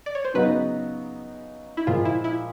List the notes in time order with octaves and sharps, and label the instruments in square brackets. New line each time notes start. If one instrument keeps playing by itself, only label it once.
[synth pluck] D5
C#5
C5
[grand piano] C#3 F#3 B3 D#4 F#4 [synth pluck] B4
[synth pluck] E4
[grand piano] A#2 F3 G#3 [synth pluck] F4
[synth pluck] E4
E4